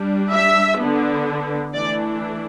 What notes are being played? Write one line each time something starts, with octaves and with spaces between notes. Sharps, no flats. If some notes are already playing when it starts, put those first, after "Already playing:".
Already playing: G3 D4
E5
D3 B3 D4
E3 A3 D4 D5